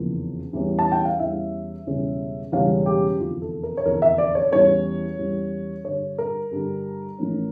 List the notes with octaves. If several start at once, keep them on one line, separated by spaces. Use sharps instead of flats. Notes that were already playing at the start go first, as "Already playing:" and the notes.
Already playing: F1 E2 C#3 F3 A#3
E2 E3 G3 C#4
A5
G5
F5
E2 E3 G3 C#4 E5
E1 E2 C#3 G3 C#4
E1 E2 C#3 G3 C#4 F5
G4
F1 E2 D3 F4
A4
A#4
C#5
F1 E2 D3 A#4
E5
D5
C#5
E2 E3 G3 C#4 C#5
E2 E3 G3 C#4
G2 D3 G3 C#5
A#4
G2 D3 G3
A1 A2 F3 A#3 C#4